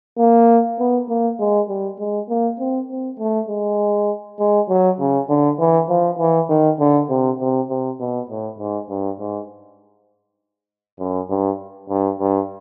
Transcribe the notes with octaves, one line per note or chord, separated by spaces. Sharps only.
A#3
B3
A#3
G#3
G3
G#3
A#3
C4
C4
A3
G#3
G#3
F#3
C#3
D3
E3
F3
E3
D#3
D3
C3
C3
C3
B2
A2
G#2
G2
G#2
F#2
G2
G2
G2